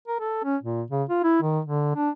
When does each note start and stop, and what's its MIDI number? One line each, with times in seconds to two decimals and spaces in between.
0.08 0.19 70
0.20 0.42 69
0.44 0.57 61
0.63 0.83 46
0.91 1.04 49
1.09 1.21 65
1.24 1.39 64
1.42 1.60 51
1.65 1.91 50
1.96 2.10 62